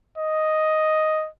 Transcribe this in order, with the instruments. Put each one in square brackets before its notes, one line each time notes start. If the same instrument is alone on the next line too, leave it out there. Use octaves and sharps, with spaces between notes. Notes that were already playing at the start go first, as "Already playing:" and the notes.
[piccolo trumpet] D#5